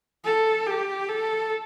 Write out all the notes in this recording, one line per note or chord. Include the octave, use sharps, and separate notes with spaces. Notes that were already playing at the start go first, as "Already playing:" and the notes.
A4
G4
A4